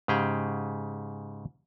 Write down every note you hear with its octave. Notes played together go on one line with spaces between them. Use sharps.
G#2 C#3 G4 G#4 G5